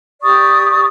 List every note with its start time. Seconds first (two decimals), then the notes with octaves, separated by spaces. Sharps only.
0.22 G4 D5 C#6 D#6